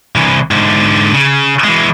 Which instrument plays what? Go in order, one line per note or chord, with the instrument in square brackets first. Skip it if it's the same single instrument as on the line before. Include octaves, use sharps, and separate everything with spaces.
[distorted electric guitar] C2 E3
G#2 D3
C#3
E3 G#3